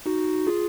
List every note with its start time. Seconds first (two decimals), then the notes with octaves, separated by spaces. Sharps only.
0.06 D#4 F#4
0.47 F4 G#4